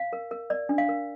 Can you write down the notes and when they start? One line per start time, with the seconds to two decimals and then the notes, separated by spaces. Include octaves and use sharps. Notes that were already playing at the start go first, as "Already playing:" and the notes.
Already playing: F5
0.13 A#4
0.31 A#4
0.50 A#4 D5
0.69 D4
0.78 F5
0.89 A#4